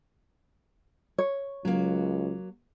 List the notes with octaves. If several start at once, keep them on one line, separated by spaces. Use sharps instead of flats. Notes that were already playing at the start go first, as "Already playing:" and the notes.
C#5
C#2 F#3 A#3